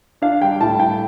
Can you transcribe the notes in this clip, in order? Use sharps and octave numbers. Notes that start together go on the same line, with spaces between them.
D4 F5
G3 G5
A2 A5
A2 G5